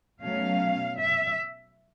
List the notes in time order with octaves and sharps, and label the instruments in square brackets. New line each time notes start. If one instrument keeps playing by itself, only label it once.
[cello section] B2 F#3 A3 C#4 F5
E5